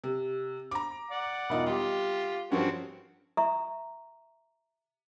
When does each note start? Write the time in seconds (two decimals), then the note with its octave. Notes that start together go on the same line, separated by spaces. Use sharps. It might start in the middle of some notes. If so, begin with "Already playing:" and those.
0.04 C3
0.71 A#5 D6
1.11 D5 F#5
1.50 E1 D#4 F4
1.66 G3 F4 G4
2.52 G2 F3 C4 C#4 F#4 A#4
3.37 E5 A#5 C#6